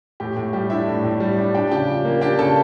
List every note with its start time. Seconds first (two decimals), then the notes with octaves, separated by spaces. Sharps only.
0.20 A2 G4
0.37 A2
0.53 G3 G4
0.70 D4 E4 E5
0.88 A2
1.04 A2
1.20 G3
1.38 D4
1.54 D4 G4 G5
1.71 C#3 G4 G5
1.88 F3
2.05 A#3
2.21 D4 G4 G5
2.38 C#3 A4 A5